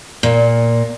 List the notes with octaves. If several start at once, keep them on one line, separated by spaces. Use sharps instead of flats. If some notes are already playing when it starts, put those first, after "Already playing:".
A#2